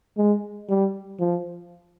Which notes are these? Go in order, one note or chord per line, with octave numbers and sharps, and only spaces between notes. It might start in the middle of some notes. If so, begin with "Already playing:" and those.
G#3
G3
F3